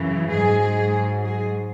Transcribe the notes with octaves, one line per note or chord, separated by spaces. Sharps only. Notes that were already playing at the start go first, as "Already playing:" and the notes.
Already playing: F#2 C#3 E3
G#2 F#3 G#4
G#4